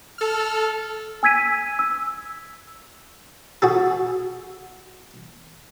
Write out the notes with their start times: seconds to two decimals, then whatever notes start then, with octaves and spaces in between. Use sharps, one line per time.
0.18 A4 F6
1.23 G#5 E6 G#6 B6 D#7
1.79 E6
3.62 F#4 G#4 A4